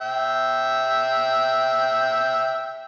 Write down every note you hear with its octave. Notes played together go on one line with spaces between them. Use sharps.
E5 G5